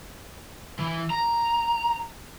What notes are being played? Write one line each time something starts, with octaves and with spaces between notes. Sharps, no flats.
E3
A#5